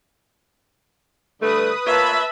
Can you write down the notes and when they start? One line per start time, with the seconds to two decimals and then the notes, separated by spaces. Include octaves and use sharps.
1.41 D3 G3 A3 B4 D#6
1.86 A#3 F4 B4 C#5 E5 A5 B5